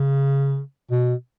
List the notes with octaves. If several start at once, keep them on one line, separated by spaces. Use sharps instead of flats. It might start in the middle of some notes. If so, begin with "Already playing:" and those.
Already playing: C#3
B2